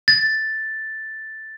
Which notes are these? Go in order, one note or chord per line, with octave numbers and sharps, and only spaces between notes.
A6